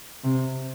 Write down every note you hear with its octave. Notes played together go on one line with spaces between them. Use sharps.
C3